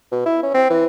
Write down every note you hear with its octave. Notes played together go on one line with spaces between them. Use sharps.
B2
E4
C#4
C4
E3